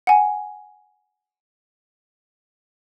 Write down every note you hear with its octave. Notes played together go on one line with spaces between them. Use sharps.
F#5 G#5